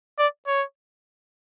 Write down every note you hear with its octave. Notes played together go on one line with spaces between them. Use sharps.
D5
C#5